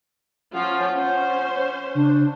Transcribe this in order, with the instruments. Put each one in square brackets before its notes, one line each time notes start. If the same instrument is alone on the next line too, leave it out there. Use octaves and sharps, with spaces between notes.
[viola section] F3 C#4 F4 [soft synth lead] F#5
[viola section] C#4 C5
[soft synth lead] C#3 [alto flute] D4